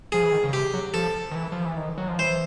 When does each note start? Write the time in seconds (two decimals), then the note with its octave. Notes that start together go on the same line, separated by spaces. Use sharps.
0.12 F3 G#4
0.23 E3
0.33 D#3
0.44 C#3
0.53 C3 G4
0.74 F#3
0.94 F3 A4
1.32 D#3
1.35 E3
1.52 F3
1.65 E3
1.77 D#3
1.98 F#3
2.08 F3
2.19 E3 C5